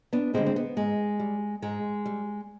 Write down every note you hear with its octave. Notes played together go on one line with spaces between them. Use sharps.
B3 D4
D3 G3 G#3 C4
C4
B3
G#2 G#3
G3
G#2 G#3
G3